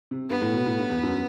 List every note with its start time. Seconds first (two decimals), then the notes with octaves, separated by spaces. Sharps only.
0.11 C3
0.30 G2 B3
0.42 A2
0.54 B2
0.66 A2
0.78 G2
0.90 E2
1.03 F#2